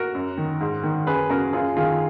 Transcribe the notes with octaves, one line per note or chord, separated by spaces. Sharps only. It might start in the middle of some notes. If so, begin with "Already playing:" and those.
Already playing: F#4 A#4
F#2
D#3
G#2
D#3
F#2 G#4 B4
C#3 F#4 A#4
F#2 F4 G#4
D#3 F4 G#4